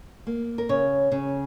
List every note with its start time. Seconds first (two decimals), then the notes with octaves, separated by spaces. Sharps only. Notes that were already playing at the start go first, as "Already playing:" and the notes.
0.27 A#3
0.58 A#4
0.69 C#3 C#5
1.12 C#3